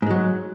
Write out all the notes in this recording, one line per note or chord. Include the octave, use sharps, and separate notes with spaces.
G#2 F#3 G#3